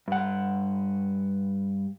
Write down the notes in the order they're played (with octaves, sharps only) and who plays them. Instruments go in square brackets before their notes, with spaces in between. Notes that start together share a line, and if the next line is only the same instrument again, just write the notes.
[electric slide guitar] G2 F#5